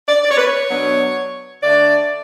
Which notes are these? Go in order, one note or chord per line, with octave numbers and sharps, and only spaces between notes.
D5
D5
C#5
B4
C#5
B2 F#3 B3 D4
D3 A3 D4 D5